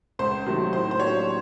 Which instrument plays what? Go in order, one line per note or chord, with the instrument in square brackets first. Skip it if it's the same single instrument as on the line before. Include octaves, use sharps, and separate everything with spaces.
[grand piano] C#2 [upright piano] C5
[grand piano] C3 D#3 F#3 A3
[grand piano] A2 [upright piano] C5
[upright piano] C5
[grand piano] F#3 A#3 D4 G4 [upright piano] C#5